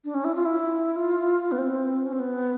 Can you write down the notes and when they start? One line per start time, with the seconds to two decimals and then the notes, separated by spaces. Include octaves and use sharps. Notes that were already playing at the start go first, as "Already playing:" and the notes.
0.05 D4
0.14 C#4
0.25 E4
0.35 F4
0.45 E4
0.96 F4
1.52 B3
1.58 C4
2.06 C#4
2.13 C4
2.20 B3